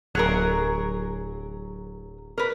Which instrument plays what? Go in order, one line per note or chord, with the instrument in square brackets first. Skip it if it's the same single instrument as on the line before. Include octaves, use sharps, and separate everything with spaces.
[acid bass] D1 [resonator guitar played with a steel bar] F#3 G#4 A#4
[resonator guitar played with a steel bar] A#4 B4